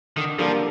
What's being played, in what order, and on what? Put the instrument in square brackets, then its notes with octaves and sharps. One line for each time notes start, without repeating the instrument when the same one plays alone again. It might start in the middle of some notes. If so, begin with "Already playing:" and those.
[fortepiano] D3 [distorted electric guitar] D#3
[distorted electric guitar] F3 [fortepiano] G3 A#3 D4 A4